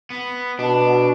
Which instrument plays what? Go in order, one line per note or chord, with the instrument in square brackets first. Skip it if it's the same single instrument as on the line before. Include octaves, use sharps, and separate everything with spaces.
[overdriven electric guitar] B3
[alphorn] B2 [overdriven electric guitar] D4